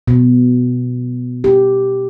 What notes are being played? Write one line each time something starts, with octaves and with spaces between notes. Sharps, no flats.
B2
G4